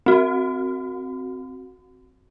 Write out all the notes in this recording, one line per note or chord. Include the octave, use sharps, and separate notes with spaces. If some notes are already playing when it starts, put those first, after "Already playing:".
C4 F#4